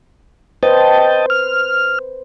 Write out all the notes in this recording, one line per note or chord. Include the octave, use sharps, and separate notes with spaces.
B4 C5 D#5 G5 A5
F6